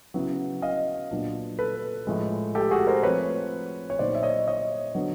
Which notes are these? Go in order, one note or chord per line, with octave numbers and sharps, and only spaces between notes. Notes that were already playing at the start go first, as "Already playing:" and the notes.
C#3 F#3 B3 E4
D#5 F5
A#2 F#3 B3 D4 F4
A4 B4
A2 F3 G#3
G4 A4
F#4 G#4
A#4 C5
F3 A3 C4 B4 C#5
C#5
A#2 F#3 B3 D#4 C5 D5
E5
C#5 D#5
C#5 D#5
D3 F#3 B3